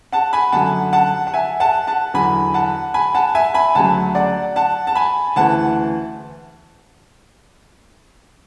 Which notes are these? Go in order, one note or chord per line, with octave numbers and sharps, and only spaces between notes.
F#5 A5
G#5 B5
F#2 D3 F#3 F#5 A5
F#5 A5
F#5
E5 G#5
F#5 A5
F#5 A5
E2 D3 F#3 G#5 B5
F#5 A5
G#5 B5
F#5 A5
E5 G#5
G#5 B5
D2 C#3 F#3 F#5 A5
D5 F#5
F#5 A5
A5
G#5 B5
D2 C#3 E3 F#5 A5